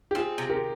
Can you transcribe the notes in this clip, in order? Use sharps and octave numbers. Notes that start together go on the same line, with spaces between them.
G4
C4 F4 G#4
C3
G4 A#4